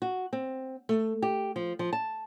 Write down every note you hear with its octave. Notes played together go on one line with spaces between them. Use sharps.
F#4
C4
A3
G4
F3
F3
A5